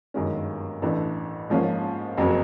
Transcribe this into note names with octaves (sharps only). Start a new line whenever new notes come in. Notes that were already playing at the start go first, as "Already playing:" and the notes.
G1 F#2 D#3 G#3 C#4
A1 A2 E3 A3 D4
G#2 F3 A#3 C#4 F4
F#1 F2 C#3 F#3